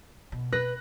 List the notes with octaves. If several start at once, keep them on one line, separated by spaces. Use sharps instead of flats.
B2
B4 F#6 A#6